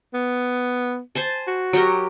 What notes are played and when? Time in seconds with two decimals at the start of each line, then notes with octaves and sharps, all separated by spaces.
0.14 B3
1.15 C5 G#5 A5
1.47 F#4
1.73 F#3 G4 A#4